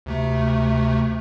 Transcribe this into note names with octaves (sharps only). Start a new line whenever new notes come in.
D2 C3 A3